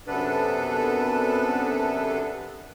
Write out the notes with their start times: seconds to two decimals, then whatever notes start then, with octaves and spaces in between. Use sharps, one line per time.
0.07 F#2 C3 B3 D4 A4 B4